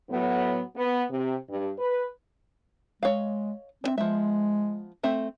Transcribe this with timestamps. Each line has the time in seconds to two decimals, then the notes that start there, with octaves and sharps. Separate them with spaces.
0.11 A2 F#3 B3
0.77 B3
1.11 C3
1.50 G2
1.79 B4
3.03 G#3 C#5 D#5 F5
3.84 C4 D4 E5
3.98 F3 G#3 B3 E5
5.03 A3 C4 E5